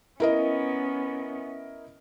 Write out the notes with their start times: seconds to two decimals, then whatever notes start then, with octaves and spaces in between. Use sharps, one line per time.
0.20 B3 C#4 E4 A#4 D#5